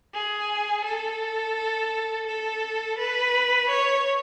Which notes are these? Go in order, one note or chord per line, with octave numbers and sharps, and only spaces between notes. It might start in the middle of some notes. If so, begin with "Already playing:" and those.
G#4
A4
A4
B4
C#5